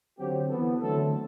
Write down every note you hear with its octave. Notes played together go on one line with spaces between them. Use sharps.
D3 F#3 C4 G4
E3 B3 A4
D3 F#3 A3 C4 A4